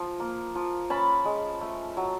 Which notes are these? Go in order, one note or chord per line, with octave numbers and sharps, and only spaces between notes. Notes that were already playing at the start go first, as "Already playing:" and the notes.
Already playing: F3
A#3
F3
C#4 A5 B5
G#3
A3
F#3